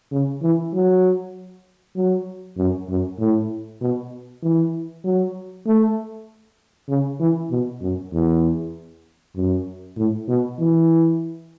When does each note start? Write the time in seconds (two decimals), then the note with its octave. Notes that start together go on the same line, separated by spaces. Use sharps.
0.12 C#3
0.42 E3
0.73 F#3
1.96 F#3
2.57 F#2
2.89 F#2
3.19 A2
3.81 B2
4.42 E3
5.04 F#3
5.66 A3
6.89 C#3
7.20 E3
7.51 B2
7.82 F#2
8.13 E2
9.36 F#2
9.97 A2
10.28 B2
10.59 E3